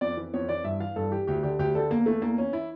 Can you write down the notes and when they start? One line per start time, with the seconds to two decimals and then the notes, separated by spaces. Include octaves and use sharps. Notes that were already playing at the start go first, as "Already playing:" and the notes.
0.01 F2 D5
0.17 E3
0.34 F2 C#5
0.49 E3 D5
0.64 G2 E5
0.80 E3 F5
0.96 G2 A4
1.11 E3 G4
1.27 D2 G4
1.43 D3 G4
1.59 D2 G4
1.75 D3 A4
1.90 E2 A#3
2.06 E3 A3
2.22 E2 A#3
2.38 E3 C#4
2.53 E4